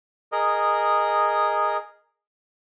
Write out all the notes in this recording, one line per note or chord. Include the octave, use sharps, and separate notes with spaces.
G#4 A#4 D#5